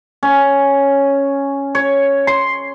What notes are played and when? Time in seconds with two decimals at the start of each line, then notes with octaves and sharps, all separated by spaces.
0.23 C#4
1.75 C#5
2.27 C6